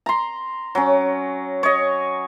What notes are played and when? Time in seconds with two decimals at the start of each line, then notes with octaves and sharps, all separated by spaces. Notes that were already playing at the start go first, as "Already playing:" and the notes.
0.06 A#5 C6
0.75 F#3 C#4
1.63 C#5 D#5